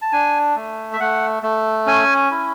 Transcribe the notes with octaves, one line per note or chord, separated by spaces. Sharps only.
A5
D4 G#5
A3
E5
A3 F#5
A3
C#4 G#5
E4